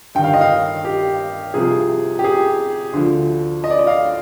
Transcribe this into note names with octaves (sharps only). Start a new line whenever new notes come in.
G2 D#3 G5
F5
D#5
F5
G4
C2 C3 F3 G#4
G4
G#4
D2 D3 F3
D#5
D5
D#5
F5